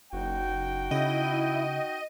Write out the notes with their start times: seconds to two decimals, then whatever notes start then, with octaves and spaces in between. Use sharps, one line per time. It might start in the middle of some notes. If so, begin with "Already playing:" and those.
0.13 F#1 D#4 F#4 G5
0.91 C#3 E4 D#5